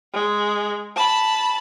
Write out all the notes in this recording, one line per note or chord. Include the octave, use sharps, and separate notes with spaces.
G#3
A5 B5